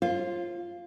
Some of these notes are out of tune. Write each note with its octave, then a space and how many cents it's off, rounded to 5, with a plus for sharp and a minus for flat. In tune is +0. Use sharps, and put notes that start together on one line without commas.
F4 -5 C5 +40